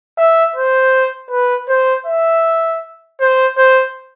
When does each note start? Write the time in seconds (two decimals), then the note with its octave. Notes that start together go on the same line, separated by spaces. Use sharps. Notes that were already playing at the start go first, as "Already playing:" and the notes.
0.18 E5
0.56 C5
1.31 B4
1.69 C5
2.06 E5
3.21 C5
3.58 C5